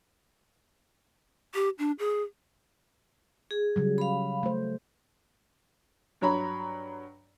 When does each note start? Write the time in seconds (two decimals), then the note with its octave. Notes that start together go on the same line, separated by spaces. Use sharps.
1.54 G4
1.79 D4
1.99 G#4
3.51 G#4
3.76 C#3 F#3 G3
3.98 F5 B5
4.43 A3 C5
6.21 G2 F#3 C#5 A#5 B5